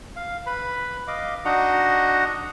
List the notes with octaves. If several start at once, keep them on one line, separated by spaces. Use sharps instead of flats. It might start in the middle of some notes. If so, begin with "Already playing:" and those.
F5
B4 B5
D#5 F5 D6
D4 D#4 F#4 D#5 F#5 A#5